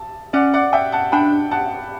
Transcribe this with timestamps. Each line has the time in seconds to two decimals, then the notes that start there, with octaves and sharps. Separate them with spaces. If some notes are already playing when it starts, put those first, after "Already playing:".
Already playing: A5
0.33 C#4 D5 F#5
0.54 D5 F#5
0.73 E5 G5
0.92 F#5 A5
1.12 D4 G5 B5
1.51 F#5 A5